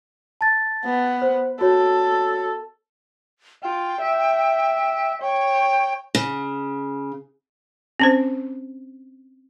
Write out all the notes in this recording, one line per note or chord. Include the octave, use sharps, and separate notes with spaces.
A5 A6
B3
C5
F#4 A4 C#5
F4 G5
E5
C#5 G5
C#3
C4 C#4 C5